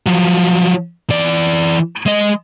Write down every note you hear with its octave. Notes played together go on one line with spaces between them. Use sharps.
F3 F#3
E3 D5
G#3 D#5